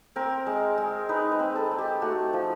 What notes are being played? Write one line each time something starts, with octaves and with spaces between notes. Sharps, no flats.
C4 A#4
G#3
G#3
D#4 B4
B4
C4
A4
G#3
G4
A3 F#4
F3